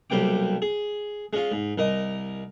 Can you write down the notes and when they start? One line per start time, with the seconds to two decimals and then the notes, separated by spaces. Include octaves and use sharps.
0.10 B1 C3 G3 A#3 G5 D6
0.62 G#4
1.33 G#3 C#4 F4
1.52 G#2
1.78 C2 A#4 D#5